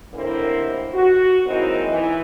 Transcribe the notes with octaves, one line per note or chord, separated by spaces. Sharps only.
D#2 A2 D3 A#3 C4 E4
F#4
F#3 G#3 A#3 C4 D#4 E4
E3